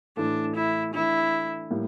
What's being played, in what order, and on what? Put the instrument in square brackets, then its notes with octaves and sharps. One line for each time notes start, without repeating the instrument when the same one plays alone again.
[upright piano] A2 E3 A3 [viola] D4
[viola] E4
[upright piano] E3 A3 D4 [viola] E4
[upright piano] A2 G3 A#3 E4